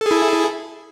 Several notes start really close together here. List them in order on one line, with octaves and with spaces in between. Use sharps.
A4 G#4 E4